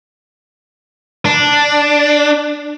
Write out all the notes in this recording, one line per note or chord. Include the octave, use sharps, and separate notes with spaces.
D4